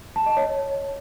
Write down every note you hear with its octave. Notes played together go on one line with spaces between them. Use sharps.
A5
D#5
C#5